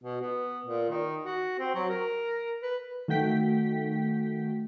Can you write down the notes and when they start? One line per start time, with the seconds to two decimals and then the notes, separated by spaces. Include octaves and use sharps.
0.04 B2
0.21 B3
0.66 A#2
0.90 D#3
1.24 F#4
1.59 C4
1.74 F#3
1.90 A#4
2.62 B4
3.08 D#3 A3 F#4 G5 B6